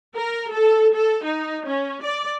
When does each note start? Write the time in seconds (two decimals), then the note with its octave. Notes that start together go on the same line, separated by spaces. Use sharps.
0.15 A#4
0.51 A4
0.95 A4
1.24 D#4
1.65 C#4
2.03 D5